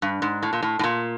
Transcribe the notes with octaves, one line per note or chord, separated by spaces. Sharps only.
G2
G#2
A2
A#2
A2
A2
A#2